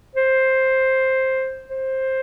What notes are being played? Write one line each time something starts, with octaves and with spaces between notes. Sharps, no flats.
C5
C5